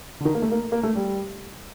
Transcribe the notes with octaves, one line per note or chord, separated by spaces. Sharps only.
D3
D#3
A#3
A3
A#3
A#3
A3
G3